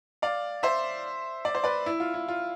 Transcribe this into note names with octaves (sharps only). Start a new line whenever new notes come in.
D5 F5
C5 E5
D5
C5
B4 D5
E4
F4
E4
F4